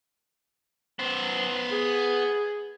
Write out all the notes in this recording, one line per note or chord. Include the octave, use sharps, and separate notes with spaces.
B3 C5
G#4